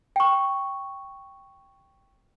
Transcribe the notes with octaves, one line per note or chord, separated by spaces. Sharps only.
G5 C#6